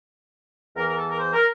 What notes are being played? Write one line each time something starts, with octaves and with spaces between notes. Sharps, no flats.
E2 E3 A#4
A#4
A4
A#4
C5
A#4